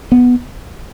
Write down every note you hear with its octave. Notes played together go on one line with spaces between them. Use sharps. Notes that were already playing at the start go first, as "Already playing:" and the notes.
B3